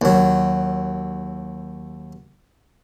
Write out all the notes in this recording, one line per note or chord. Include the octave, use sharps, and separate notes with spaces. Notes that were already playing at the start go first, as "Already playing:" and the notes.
D#2 F#3